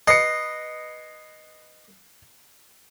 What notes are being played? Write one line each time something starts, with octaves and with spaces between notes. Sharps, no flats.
B4 D#5 C7 C#7